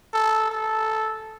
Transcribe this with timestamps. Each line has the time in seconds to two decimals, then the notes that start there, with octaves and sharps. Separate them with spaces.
0.14 A4
0.52 A4